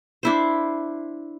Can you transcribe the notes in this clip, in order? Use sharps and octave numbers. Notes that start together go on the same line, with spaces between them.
D4 E4 C5